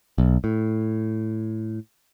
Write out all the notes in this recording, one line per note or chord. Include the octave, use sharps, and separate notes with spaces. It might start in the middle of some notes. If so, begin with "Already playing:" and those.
B1
A2